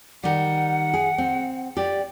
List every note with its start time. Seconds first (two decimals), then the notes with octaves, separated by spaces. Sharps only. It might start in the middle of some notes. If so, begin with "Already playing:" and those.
0.23 D#3 G3 F#5
0.94 G#4
1.18 C4
1.77 G4 D5